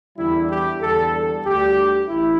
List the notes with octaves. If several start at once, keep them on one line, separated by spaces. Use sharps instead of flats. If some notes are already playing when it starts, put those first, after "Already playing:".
E2 D3 G3 E4
G4
E2 D3 G3 A4
A4
D2 D3 G3 G4
A1 E4